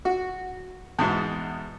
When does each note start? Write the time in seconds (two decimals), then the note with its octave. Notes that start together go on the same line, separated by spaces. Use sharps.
0.05 F#4
0.99 E2 G#2 B2